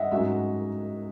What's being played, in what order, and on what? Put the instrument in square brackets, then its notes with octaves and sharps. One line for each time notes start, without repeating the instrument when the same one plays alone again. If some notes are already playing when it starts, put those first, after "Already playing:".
Already playing: [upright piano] D#5 E5 F#5
[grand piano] G#2 F#3 C#4 F#4 [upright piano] E5